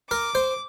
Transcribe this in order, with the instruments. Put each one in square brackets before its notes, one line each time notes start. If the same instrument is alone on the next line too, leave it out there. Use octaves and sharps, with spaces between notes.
[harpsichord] A#4 [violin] D6
[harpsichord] C5